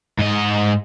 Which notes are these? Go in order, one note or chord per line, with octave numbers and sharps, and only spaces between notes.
G#2 D#5